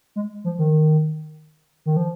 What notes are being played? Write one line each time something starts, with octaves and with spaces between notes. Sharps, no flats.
G#3
F3
D#3
D#3
F3